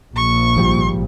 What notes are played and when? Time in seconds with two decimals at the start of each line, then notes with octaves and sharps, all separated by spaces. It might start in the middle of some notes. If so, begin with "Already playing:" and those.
0.16 A#1 C#6
0.56 G#1 F3 G3